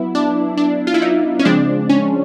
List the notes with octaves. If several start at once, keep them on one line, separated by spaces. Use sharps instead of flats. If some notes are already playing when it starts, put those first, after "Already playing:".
Already playing: F#3 B3 E4
D4
D4
F4
E4
D#4
C#4
C#3 F3 G#3 C4 D4
C#4